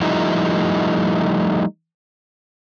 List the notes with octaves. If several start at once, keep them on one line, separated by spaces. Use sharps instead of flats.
F3 G3 A3 D#4 E4